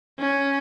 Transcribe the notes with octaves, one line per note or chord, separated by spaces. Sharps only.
C#4